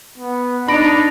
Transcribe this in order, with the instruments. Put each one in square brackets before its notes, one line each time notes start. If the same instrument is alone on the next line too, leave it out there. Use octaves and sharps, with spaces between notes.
[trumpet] B3
[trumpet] D4 [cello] D#4 [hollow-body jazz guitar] B5 [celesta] A#6 D7